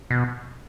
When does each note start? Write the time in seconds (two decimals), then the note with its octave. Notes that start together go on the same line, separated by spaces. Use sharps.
0.10 B2